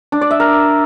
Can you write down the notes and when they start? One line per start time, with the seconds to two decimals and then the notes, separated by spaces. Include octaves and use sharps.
0.12 D4
0.21 D5
0.31 E5
0.40 A#4